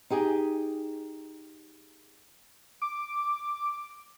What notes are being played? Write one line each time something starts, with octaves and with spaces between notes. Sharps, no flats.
D#4 G4 G#4
D6